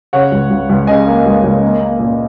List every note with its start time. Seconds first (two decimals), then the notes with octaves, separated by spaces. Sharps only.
0.13 C#3 C#5 F#5
0.32 C#2
0.50 C#2
0.69 C#2
0.87 C#3 D#5 G#5
1.06 A#3
1.26 C#2
1.43 C#2
1.62 A#3
1.80 A#3
1.99 A#2